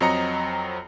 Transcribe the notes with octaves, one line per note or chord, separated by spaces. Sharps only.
F2 F#3 C4 D#5 A#5 C#7